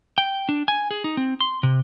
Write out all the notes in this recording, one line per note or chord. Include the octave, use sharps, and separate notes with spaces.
G5
D4
G#5
G#4
D#4
C4
C6
C3